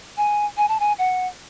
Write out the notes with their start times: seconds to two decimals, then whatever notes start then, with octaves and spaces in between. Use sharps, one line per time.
0.17 G#5
0.57 G#5
0.69 A5
0.80 G#5
0.99 F#5